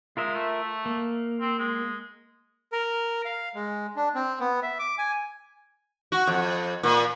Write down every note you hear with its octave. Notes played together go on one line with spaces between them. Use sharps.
G#3 F4 A#4 E5
A3
A#3
C4
G#3
A#4
F5
G#3
D4
C4
B3
E5
D6
G#5
F#4
F2
A#2